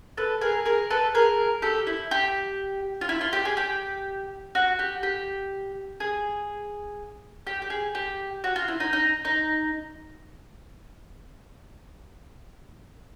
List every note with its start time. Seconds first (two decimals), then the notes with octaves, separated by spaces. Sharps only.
0.17 A4 B4
0.41 G#4 A#4
0.65 G#4 A#4
0.90 A4 B4
1.15 G#4 A#4
1.62 G4 A4
1.87 E4
2.11 G4
3.01 F4
3.09 E4
3.21 F4
3.33 G4
3.45 G#4
3.57 G4
4.55 F#4
4.79 G4
5.03 G4
6.00 G#4
7.47 G4
7.62 G4
7.70 G#4
7.95 G4
8.44 F#4
8.56 F4
8.68 E4
8.80 D#4
8.93 D#4
9.25 D#4